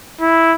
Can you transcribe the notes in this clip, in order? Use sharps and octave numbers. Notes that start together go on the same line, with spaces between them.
E4